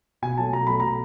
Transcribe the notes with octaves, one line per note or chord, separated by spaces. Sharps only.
B2 G#5
F#3 A3 A5
B2 A#5
F#3 A3 B5
B2 A#5